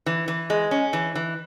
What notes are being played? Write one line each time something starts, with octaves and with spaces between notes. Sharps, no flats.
E3
E3
G#3
C#4
E3
E3